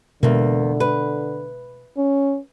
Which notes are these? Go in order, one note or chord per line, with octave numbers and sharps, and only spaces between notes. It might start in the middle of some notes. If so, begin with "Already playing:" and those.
E2 B2 D3 G#3 A#3
B4
C#4